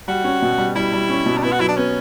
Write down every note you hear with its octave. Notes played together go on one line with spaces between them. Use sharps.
G3 F#4
C#4
B2
G3
G3 E4
G3
C#4
B2
D4
B3 E4
F#4
F#3 E4
D4
B3 C#4